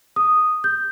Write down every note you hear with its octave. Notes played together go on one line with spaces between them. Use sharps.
D#6
G6